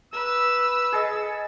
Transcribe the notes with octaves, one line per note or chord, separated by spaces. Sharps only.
B4 E6
G#4 A4 D#5